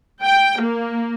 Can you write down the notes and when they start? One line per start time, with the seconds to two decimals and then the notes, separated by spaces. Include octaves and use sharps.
0.23 G5
0.61 A#3